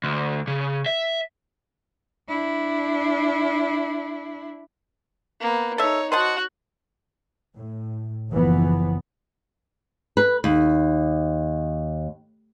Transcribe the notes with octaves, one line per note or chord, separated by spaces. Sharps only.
D2
C#3
E5
D4 E4
A#3 B3
D#4 A4 C#5 E5
F#4 C5 D#5 F#5 A5
A2
F#1 E3 F3 B3
B4
D#2